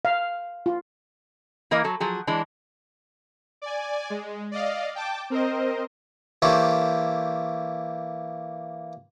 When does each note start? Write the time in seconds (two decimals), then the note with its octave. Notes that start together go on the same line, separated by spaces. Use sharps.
0.05 F5
0.66 F4
1.71 E3 A#3 A#4 D#5 F5
1.84 F#3 A4
2.00 F3 F#3 G#4
2.27 E3 G#3 D4
3.62 D5 G#5
4.10 G#3
4.52 D5 D#5 F5
4.95 G5 A5 D6
5.30 C4 A#4 C5 D#5
6.42 E3 A#3 G4 A4 C5 C#5